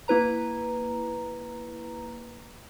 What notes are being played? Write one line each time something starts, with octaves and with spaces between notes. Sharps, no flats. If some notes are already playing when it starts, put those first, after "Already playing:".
A#3 E4 B4 A#5